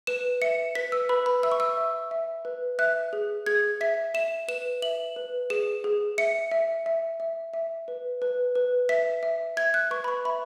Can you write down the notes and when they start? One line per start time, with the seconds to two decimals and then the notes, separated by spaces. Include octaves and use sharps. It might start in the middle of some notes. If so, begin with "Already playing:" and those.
0.07 B4 E7
0.42 E5 C#7
0.75 B4 B6
0.92 E6
1.09 B4 B5
1.26 B5
1.43 E5 E6
1.52 C#6
1.60 E6
1.77 E5
2.11 E5
2.45 B4
2.79 E5 F#6
3.13 G#4
3.46 G#4 G#6
3.81 E5 B6
4.14 E5 E7
4.48 B4 E7
4.82 E5 F#7
5.16 B4
5.50 G#4 E7
5.84 G#4
6.18 E5 C#7
6.51 E5
6.86 E5
7.20 E5
7.54 E5
7.88 B4
8.22 B4
8.55 B4
8.89 E5 B6
9.23 E5
9.57 E5 G#6
9.74 F#6
9.91 B4 C#6
10.04 B5
10.08 C#6
10.25 E5 B5